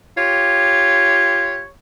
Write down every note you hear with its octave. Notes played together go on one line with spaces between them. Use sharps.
F4 G4 C#5